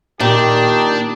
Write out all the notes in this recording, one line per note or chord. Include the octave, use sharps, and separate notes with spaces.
A#2 D#3 D4 G4